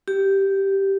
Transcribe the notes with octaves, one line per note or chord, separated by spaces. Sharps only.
G4